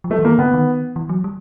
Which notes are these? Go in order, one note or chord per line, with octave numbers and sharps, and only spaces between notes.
F3
F#3 A3
E3
D#3 A#3
D3 B3
D#3
E3
F#3
G3